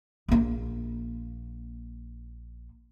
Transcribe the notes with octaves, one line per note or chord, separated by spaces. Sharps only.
A#1 A#3